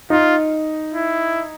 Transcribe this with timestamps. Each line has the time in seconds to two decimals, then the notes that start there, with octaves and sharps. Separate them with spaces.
0.10 D#4 F4
0.94 E4